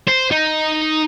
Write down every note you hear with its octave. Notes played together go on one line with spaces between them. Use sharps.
C5
D#4